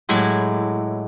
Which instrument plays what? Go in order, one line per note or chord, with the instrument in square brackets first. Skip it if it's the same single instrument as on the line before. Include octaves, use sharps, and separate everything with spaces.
[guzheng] A2 F#3 G#3 E4 G4